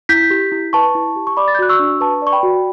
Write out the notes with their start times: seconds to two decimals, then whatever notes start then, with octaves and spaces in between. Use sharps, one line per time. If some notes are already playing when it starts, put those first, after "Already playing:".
0.09 E4 G6 B6
0.30 G4
0.52 E4
0.73 B4 A5 C#6
0.95 E4
1.16 G4
1.27 C#6
1.37 D5 B5 D6
1.48 A6
1.55 G6
1.59 F#4 F#6
1.69 C#6 E6
1.79 D4
2.01 B4 A5 C#6
2.22 D5 C#6
2.32 G5 B5
2.43 F#4